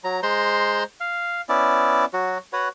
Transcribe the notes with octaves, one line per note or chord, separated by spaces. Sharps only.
F#3 A#5
G#3 C5 A#5 C6
F5
B3 C#4 E4 D5
F#3 F#4
F#4 B4 C#5 F#5